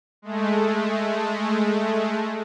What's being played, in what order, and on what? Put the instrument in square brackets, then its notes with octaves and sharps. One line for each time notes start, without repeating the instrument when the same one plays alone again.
[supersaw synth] G#3 A3